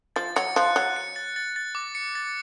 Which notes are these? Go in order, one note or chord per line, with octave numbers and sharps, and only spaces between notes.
F3 A6
F#3 C#7
F3 F#6
F#3 F#6
C#7
A6
A6
A6
D6
C#7
A6